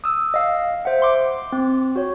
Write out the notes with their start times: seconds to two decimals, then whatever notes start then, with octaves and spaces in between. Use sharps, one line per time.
0.04 D#6 E6
0.34 D#5 F5
0.85 C5 E5 F#5
1.02 C6 D6
1.52 C4
1.96 F#4 C#5